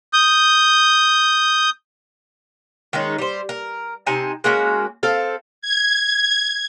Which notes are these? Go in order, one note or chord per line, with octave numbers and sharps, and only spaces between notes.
D#6 G6
D#3 G#3 C#4 D#4
G3 C5
A#4
C3 D#4 G#5 A5
G#3 A#3 C#4 F#4
C4 A4 F5
G#6